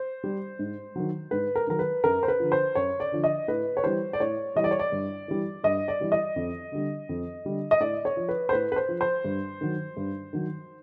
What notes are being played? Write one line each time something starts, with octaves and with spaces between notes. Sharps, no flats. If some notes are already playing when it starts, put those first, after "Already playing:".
Already playing: C5
G3
G#2
D#3 F#3
G#2 B4
A#4
D#3 F#3 A#4
B4
F#2 A#4
C5
B4
D3 F3
C5
F#2 C#5
D5
D3 F3
D#5
A2 B4
C#5
E3 G3 C5
D5
A2 C#5
E3 G3 D#5
D5
C#5
D5
G2
E3 G3
G2 D#5
D5
E3 G3
D#5
F2
D3 G3
F2
D3 G3
D#5
A2 D5
C#5
F3
B4
C5
A2 B4
B4
C5
F3
C5
G2
D#3 F#3
G2
D#3 F#3